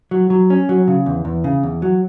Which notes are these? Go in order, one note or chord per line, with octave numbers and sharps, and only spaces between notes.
F#3
F#3
C#4
F#3
C#3
E2
E2
C#3
E2
F#3